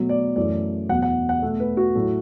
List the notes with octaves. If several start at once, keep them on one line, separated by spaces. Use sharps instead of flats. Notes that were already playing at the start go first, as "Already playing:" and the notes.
Already playing: B2 F#3 A3
D5
F#2 E3 A3 D5
E2 B2 F#3 F#5
F#5
F#5
B2 A3
B4
F#4
A2 F#3 A3